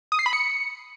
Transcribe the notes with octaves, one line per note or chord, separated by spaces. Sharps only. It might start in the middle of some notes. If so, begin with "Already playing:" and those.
D#6
C7
B5
C#7